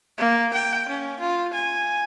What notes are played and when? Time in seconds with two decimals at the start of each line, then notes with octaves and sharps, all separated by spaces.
0.18 A#3
0.53 G5
0.89 C#4
1.20 F4
1.53 G#5